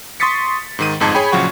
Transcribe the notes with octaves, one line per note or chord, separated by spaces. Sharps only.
C6 C#6 D#6 A6 B6 C#7
G#2 D#3 D#7
G1 F2 G#2 D#4 A5 G#6
G#4 C#5 G5 B5
A#1 C#3 F3 F#3 F#5 C#6